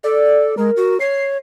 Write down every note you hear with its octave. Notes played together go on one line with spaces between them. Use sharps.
A4 D5
G#3 A#4
F#4
C#5 C7